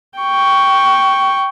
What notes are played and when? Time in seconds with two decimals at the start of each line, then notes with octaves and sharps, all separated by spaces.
0.19 G5 C#6